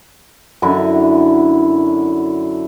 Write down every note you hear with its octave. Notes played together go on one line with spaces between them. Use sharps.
F#2 D3 E4